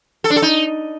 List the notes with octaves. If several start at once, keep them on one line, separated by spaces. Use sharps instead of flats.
A4
D4
A4
D#4